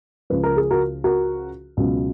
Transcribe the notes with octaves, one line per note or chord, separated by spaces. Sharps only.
C#2 C#3 F3 B4
A#4
G#4
F#4 A#4
F#4 A#4
C#2 B2 F#3